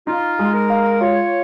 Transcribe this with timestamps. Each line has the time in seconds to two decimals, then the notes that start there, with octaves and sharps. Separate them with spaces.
0.07 D#4 F4
0.39 G#3
0.54 A#4
0.70 F5
1.01 F4 C#5